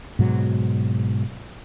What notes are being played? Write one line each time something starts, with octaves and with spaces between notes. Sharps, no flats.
G#2 B2 F#3